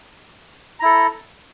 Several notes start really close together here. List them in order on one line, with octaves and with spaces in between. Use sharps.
A#5 E4 A4